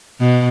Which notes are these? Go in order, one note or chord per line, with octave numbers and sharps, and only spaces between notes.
B2